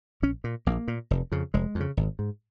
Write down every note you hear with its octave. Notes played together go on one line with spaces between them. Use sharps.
A#1 C#4
A#2
A#1 A#3
A#2
F1
F2 C#3
F1 G#3
F2
C#3
G#1
G#2